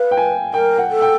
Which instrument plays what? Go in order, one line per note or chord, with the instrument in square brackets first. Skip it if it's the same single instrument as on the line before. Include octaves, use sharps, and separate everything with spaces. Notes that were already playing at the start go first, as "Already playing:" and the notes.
Already playing: [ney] B4 [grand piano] F5
[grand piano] G5
G#5
[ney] A#4 [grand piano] G5
[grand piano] F#5
[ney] A4
[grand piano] G5